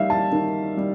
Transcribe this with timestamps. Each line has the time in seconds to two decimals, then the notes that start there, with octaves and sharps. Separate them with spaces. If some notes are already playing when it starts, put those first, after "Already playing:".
Already playing: D#3 G3 E5 F5
0.10 A5
0.32 D#3
0.77 G3